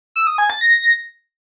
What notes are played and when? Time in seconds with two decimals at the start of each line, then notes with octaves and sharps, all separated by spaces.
0.16 E6
0.27 D#6
0.38 G#5
0.50 A6
0.61 A#6